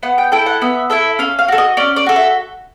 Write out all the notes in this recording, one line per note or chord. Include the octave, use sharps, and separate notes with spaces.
B3 F#5
G5
E4 A4 G5
F#5
B3 E5
E4 A4 E5
C#4 F5
F5
F#4 A4
D#5
C#4 D5
D5
F#4 A4
E5